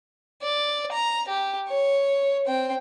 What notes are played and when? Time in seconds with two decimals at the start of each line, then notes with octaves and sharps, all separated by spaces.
0.42 D5
0.92 A#5
1.29 G4
1.69 C#5
2.46 C4 G5